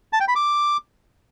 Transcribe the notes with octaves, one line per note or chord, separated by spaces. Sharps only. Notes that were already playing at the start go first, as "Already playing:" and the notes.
A5
G5
B5
D6